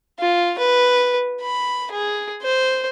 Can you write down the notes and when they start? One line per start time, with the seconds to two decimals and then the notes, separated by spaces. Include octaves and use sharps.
0.19 F4
0.59 B4
1.41 B5
1.91 G#4
2.42 C5